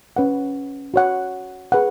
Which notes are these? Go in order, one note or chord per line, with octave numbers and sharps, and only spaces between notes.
C#4 B4 F#5
F#4 C#5 F#5
G#4 B4 F#5